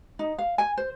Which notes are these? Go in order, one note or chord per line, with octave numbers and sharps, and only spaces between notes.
D#4
F5
G#5
C5